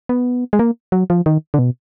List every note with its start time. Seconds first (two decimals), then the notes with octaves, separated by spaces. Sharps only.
0.09 B3
0.53 G#3
0.59 A#3
0.92 F#3
1.10 F3
1.26 D#3
1.54 D3
1.59 B2